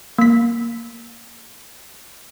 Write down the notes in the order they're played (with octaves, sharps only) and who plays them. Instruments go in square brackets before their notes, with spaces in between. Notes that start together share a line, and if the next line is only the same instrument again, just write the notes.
[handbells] A#3 B6